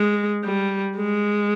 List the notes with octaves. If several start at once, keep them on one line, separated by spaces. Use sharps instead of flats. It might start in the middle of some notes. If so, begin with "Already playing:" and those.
Already playing: G#3
G3
G#3